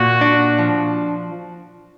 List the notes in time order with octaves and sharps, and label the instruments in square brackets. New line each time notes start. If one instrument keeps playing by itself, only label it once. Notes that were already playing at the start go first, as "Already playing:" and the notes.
Already playing: [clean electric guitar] A#2 [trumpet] F#4
[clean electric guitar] D4
F3